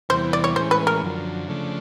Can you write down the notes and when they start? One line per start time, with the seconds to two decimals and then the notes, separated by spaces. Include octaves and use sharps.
0.09 E2 C3 E3 G3 B3 C5
0.33 D5
0.44 C#5
0.56 A2 E3 G#3 C#4 C5
0.71 B4
0.87 A#4
1.02 F#2 D3 F3
1.48 C#3 F3 A3 D4